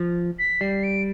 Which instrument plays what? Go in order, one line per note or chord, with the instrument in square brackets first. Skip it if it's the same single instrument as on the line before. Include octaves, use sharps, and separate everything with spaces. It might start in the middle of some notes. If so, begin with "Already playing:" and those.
Already playing: [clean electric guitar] F3
[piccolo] B6
[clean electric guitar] G3 [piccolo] C7
[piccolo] D7